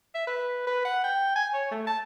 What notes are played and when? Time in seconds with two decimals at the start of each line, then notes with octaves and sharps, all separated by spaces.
0.14 E5
0.27 B4
0.67 B4
0.85 F#5
1.04 G5
1.36 G#5
1.54 C#5
1.71 A3
1.87 A5